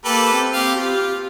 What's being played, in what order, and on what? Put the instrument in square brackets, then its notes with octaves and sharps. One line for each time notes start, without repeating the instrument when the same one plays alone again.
[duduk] A#3 [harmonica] G4 A4 B4
[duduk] C4
[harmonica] G4 F5
[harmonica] F4 [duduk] G4